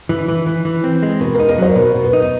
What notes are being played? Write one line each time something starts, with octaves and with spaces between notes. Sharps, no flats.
E3
E3
E3
E3
C4
G#3
B2 A#4
D#4 A#4
A#4
F#3 C5
B2 A#4
B2
B4
D#4
B4